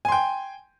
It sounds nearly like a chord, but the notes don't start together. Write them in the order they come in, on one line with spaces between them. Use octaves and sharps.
G#5 C6 G5